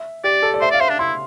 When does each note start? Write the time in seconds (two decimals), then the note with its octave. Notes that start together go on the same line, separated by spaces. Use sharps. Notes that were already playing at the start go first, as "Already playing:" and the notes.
Already playing: E5
0.24 G4 D5
0.43 A4
0.54 D5
0.61 C5 E5
0.71 D5
0.74 F5
0.80 C5 E5
0.89 D4
0.99 E4 C6